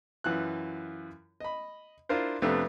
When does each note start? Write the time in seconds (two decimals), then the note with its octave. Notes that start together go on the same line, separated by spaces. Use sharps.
0.24 F#2 E3 F4 F#6
1.40 D#5 B5
2.09 D4 E4 F4 A#4 C5
2.42 F2 C3 A3 B3 D4